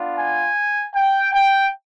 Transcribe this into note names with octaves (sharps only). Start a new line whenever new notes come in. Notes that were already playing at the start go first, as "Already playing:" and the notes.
Already playing: B3 D4 F4
G#5
G5
G5